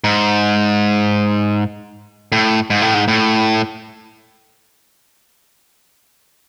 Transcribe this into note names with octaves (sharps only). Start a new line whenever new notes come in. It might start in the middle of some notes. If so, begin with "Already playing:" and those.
G#2
A2
G#2
A2
G#2
A2